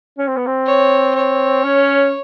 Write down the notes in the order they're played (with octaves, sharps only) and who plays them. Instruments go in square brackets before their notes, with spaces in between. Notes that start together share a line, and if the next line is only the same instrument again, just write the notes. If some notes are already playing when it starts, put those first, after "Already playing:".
[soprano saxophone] C#4
C4
B3
C4
[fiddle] C#5
C#5
[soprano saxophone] C#4